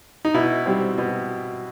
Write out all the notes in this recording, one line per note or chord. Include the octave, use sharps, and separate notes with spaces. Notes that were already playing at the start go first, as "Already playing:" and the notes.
D#4
B2 E4
G3 C4
B2